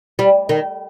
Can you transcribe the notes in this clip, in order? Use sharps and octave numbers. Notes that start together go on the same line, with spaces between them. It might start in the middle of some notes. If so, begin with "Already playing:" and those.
G3
D#3